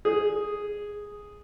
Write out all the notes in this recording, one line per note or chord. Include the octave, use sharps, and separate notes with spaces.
G#4